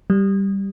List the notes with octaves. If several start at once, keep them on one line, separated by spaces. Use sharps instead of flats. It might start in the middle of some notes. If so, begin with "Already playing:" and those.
G3